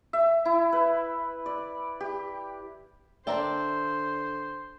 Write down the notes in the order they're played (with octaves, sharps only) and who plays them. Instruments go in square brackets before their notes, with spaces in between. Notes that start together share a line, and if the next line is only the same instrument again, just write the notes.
[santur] E5
E4
B4
D5
G4
[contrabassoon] D3 [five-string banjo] D4 A#4 G5 [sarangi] C5 [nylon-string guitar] D5 E5